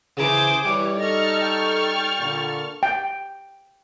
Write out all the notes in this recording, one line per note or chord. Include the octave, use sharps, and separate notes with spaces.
C#3 E3 G#4 C5 D6
E3 G3 C#5 D6
D#4 A4 D#5 C#6 F6 A6
G5
A#2 D3
G5